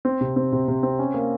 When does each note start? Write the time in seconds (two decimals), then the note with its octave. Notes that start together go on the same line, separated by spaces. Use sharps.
0.05 C4
0.21 C3
0.36 C4
0.52 C3
0.68 C3
0.83 C4
0.99 C#4
1.14 A#3